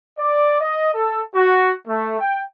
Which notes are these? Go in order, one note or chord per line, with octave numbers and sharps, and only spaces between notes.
D5
D#5
A4
F#4
A3
G5